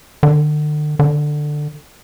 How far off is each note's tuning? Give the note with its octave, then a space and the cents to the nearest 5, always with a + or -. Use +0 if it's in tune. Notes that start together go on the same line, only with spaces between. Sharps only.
D3 +40
D3 +15